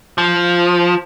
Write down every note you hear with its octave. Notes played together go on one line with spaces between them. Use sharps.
F3